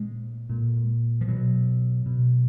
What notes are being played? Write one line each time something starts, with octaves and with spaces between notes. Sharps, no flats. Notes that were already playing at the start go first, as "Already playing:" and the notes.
Already playing: A#2 G#3
A#2
F3
B2 F#3
B2